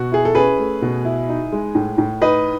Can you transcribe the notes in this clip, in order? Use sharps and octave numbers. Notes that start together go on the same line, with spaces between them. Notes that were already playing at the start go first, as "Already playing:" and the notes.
Already playing: B2 F#4
E4 G#4
A4
C#4 G#4 B4
A3
B2
E4
D#4
G#3
A2
A2
D#4 B4 D#5